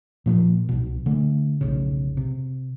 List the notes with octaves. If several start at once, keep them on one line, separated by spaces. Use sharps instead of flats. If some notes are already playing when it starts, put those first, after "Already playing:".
A#2 F3 G#3 A#3
C2 B2
D3 A3
F1 B1 C#3
C3